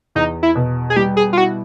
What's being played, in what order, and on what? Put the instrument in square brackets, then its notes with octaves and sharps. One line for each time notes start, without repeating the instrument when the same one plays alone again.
[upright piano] E2 [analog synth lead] D#4
[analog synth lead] E4
[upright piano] B2
[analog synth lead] G#4
[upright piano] G3 [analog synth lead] G4
[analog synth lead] G#4
F4
[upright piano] E4 [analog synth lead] F#4